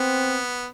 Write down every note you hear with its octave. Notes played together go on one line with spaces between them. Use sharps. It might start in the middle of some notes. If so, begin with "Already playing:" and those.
Already playing: B3 C4